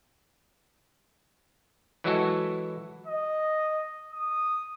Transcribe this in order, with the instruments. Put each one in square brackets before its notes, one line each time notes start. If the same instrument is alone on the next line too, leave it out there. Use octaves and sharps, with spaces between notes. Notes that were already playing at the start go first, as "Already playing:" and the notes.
[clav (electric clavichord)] E3 F#3 G#3 E4 F#4 A4
[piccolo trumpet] D#5
D#6